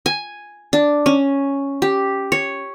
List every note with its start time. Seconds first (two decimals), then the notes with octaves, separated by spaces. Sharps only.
0.06 G#5
0.73 D4
1.06 C#4
1.82 G4
2.32 C#5